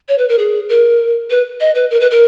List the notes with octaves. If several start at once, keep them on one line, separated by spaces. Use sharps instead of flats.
C#5
B4
A#4
G#4
A#4
B4
D#5
B4
A#4
B4
A#4